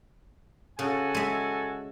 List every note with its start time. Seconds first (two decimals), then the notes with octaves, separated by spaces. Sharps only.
0.79 C#3 F#4 A4 G#5
1.15 G#3 E5